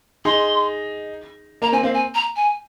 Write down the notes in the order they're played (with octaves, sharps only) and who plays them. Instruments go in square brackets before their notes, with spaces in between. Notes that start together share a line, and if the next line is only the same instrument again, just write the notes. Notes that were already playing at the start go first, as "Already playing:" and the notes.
[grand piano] D#4 G#4 [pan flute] C6
[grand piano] A#3 [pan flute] A#5
[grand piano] C4 [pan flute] G#5
[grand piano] C4 [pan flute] F5
[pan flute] G#5
A#5
G#5